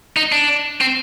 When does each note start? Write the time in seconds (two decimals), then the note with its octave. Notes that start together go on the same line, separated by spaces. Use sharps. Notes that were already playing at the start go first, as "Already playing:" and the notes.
0.17 D#4
0.32 D4
0.81 C4